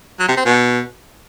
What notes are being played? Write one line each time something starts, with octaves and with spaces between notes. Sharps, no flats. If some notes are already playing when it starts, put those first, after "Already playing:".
F#3
C3
C4
B2